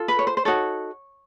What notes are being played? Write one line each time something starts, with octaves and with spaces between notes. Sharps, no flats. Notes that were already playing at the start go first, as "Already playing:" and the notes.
Already playing: F4 A4
B4
C#5
C5
C5
D#4 F#4 A4 C#5